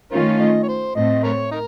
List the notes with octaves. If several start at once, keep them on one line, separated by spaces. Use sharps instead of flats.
D#3 A3 C#4 F4 A#4 C#5
D#5
C#5
C5
A2 A3 C4 D#5
A#4 C#5
D#4 A#4